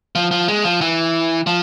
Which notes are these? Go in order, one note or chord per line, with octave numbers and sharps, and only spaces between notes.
F3
F3
G#3
F3
E3
F3